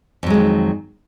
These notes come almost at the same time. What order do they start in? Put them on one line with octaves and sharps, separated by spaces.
F2 F#3 G#3 D#3